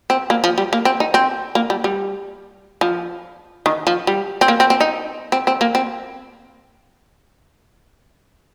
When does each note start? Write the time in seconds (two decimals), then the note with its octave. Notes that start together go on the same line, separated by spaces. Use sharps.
0.10 C4
0.30 A#3
0.44 F3
0.58 G3
0.73 A#3
0.85 C4
1.00 D#4
1.14 C4
1.55 A#3
1.70 G3
1.84 G3
2.81 F3
3.66 D#3
3.87 F3
4.07 G3
4.41 C4
4.48 A#3
4.60 C4
4.70 C4
4.80 D#4
5.32 C4
5.47 C4
5.61 A#3
5.75 C4